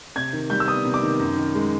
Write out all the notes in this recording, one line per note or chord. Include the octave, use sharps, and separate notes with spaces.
C3 G#6
D#3
G3 G6
E6
B3 D#6
C3
D6
D#3
F#2
D#3
G#3